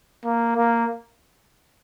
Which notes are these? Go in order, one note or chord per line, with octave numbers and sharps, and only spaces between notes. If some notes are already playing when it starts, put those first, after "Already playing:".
A#3
A#3